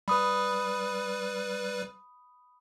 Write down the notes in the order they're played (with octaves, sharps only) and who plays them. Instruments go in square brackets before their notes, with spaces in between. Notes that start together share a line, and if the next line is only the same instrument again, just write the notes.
[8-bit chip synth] G3 B4 [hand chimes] B5 D#6